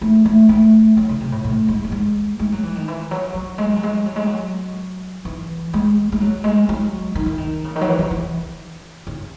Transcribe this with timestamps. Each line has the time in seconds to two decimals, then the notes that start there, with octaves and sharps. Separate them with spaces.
0.01 A3
0.25 A3
0.49 A3
0.97 F#3
1.09 C#3
1.20 C3
1.32 A2
1.44 A2
1.68 G#3
1.84 A3
1.92 G#3
2.39 G#3
2.52 F#3
2.63 E3
2.75 D#3
2.88 E3
3.11 F#3
3.34 F#3
3.58 G#3
3.76 F#3
3.83 G#3
4.06 F#3
4.16 G#3
4.26 F#3
5.25 E3
5.74 G#3
6.12 G#3
6.21 F#3
6.44 G#3
6.69 F#3
7.15 D#3
7.26 E3
7.38 D#3
7.64 C#3
7.76 D#3
7.81 F#3
7.87 E3
7.99 E3
8.11 E3
9.07 C#3